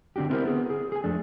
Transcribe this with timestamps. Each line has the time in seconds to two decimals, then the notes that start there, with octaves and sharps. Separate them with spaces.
0.16 D3 C4 D4 F#4 G4
0.29 B3 C4 E4 G4 A#4 C5
0.45 B3 G#4
0.70 G#4
0.92 G#4 G#5
1.04 F2 A3 D4